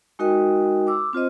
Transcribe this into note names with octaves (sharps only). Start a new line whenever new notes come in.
G#3 D#4 F#4 A#4 D#5 G5
D6 E6
C4 F4 C5 D#5